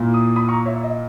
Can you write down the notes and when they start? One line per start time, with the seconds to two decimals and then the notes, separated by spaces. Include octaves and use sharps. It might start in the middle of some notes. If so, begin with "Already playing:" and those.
Already playing: A#2 A#3 E4
0.14 D#6
0.36 B5 D#6
0.49 A#5 C#6
0.65 C#5 E5
0.83 D#5